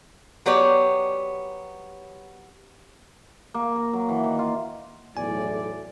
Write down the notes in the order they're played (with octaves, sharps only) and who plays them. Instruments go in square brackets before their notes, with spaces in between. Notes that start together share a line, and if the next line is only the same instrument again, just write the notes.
[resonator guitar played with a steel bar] F#3 B3 G4 C#5 D5
[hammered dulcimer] A#3
A#4
F#3
E3
D#3
F4
[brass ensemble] B1 E2 A2 [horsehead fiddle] D5 [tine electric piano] G#5